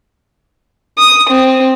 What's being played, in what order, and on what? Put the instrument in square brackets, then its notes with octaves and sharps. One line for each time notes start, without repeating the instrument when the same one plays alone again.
[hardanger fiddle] D#6
C4